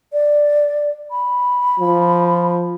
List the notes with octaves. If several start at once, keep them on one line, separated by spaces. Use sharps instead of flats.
D5
B5
F3